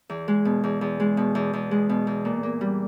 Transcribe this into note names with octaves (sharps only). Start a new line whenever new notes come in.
E2
G#3
B2
E2
E2
G#3
B2
E2
E2
G#3
B2
E2
A#2
A#3
G3